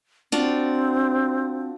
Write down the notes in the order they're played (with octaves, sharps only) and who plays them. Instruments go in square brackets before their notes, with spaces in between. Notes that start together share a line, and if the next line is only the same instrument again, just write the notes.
[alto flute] C4 [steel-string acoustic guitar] D4 F4 F#4